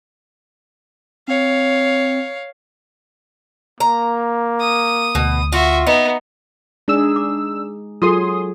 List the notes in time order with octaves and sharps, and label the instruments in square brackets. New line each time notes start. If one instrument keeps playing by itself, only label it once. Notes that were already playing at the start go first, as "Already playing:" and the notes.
[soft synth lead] C4 [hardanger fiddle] C#5 F5
[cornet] A#3 [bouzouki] A#5
[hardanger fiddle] D#6
[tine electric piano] D2 [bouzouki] B2
[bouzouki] F4 [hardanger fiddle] F#4 E5
[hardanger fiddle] B3 [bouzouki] D#4
[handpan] G#3 D#4 G#4 [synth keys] D4 E6
[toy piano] D6
[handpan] F#3 G#4 [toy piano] F4 A4 [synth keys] C6 D#6